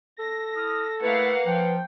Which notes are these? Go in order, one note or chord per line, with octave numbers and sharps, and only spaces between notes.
A4 A#6
E4 D#6 F6
A3 A#3 E4 B4 F5 F#5
F3 G5